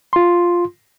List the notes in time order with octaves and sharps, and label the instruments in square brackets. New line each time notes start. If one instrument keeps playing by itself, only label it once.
[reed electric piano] F4 C6